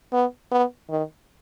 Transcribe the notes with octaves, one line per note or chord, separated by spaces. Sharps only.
B3
B3
D#3